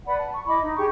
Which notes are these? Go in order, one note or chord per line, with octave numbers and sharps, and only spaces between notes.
B4 D5 F#5 B5
A5
C#6
E4 D#5 B5 D6
D#4
G4 G#4 C#6